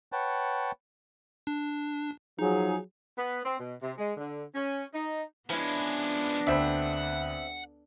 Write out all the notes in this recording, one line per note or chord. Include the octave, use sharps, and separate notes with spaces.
B4 C#5 F#5 G5 A5
D4
F3 F#3 D#4 G#4
B3
C4
B2
C3
G#3
D3
C#4
D#4
F3 G#3 B3 C#4 D4 E4 B4
D2 C4 E5 F#5 B5